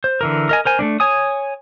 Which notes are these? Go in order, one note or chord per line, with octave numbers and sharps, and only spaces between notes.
C5
D3 E3 A#4
A#4 D#5 G#5
A#4 C5 G#5
A3 A#3 D4
C#5 G#5 D#6